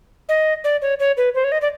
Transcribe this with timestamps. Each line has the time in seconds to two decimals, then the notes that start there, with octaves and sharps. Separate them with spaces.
0.29 D#5
0.64 D5
0.82 C#5
0.99 C#5
1.17 B4
1.35 C5
1.44 C#5
1.52 D#5
1.62 D5